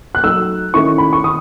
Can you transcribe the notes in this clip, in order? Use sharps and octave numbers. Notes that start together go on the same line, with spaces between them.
F#6
F#3 A3 D#4 E6
D#3 A3 C#4 E4 C#6
B5
C#6
D#3 D#6